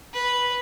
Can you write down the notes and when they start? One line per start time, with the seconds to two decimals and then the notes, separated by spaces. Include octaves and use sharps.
0.13 B4